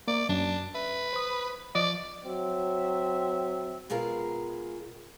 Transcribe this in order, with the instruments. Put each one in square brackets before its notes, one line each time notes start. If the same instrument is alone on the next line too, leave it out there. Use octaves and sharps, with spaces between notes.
[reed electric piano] A#3 [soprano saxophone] D5
[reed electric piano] F#2 [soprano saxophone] D4
[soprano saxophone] B4 [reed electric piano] E5
[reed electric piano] C5 D#6
[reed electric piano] F3 D#5 [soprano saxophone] D5
[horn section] F#3 C4 E5
[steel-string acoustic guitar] B2 G#3 F4 G#4 A#4